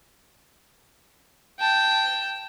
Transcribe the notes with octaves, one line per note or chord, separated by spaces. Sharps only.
G5 A5